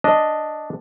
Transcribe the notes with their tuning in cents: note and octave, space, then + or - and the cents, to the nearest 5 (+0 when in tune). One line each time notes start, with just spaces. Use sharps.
D4 +0 D#5 +0